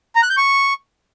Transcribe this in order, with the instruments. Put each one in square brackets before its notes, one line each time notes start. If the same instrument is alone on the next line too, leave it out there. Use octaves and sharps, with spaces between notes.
[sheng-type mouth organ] A#5
F#6
G6
C#6